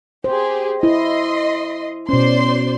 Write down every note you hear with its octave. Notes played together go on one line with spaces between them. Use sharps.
G4 G#4 C5
E4 D#5 C6
B2 C#4 C5 D5 C6